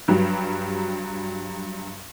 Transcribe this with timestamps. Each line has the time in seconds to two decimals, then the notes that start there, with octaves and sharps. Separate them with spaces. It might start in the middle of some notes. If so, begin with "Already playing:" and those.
0.08 G2 F#3 G3